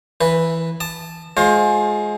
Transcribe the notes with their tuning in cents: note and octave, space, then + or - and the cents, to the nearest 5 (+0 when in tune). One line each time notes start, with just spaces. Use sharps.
E3 +0 B4 +0
A5 +0 D#6 -40
G#3 +20 F4 +30 C5 +30